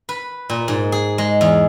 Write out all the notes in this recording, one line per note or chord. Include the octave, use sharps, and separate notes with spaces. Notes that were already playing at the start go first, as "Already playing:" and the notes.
B4
A#2
G#2
G#4
G#3
E2